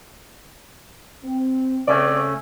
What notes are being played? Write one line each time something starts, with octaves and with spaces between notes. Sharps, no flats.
C4
C#3 A3 C4 C#4 D5